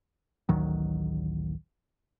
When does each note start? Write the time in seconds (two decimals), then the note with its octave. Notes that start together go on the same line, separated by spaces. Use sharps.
0.49 A1 D2 D#3 F#3